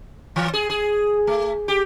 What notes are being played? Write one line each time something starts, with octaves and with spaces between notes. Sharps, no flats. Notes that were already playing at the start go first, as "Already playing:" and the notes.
E3
G#4
G#4
A3
G4